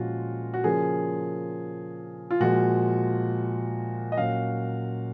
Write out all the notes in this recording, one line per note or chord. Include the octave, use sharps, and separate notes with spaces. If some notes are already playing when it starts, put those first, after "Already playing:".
Already playing: A#2 F3 G#3 C#4 F4 F#4
F#4
C#3 F3 A#3 C#4 G#4
F4
A#2 F3 G#3 F#4
D#5
A#2 F#3 C#4 F5